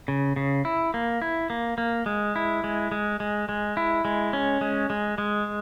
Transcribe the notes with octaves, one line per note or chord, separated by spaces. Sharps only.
C#3
C#3
E4
A#3
E4
A#3
A#3
G#3
E4
G#3
G#3
G#3
G#3
E4
G#3
C#4
G#3
G#3
G#3